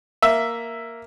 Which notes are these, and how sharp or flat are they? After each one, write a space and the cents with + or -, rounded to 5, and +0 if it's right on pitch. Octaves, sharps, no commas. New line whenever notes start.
A#3 +0 E5 +5